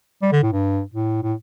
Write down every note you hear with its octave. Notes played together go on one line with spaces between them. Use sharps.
G3
D3
A2
G2
A2
A2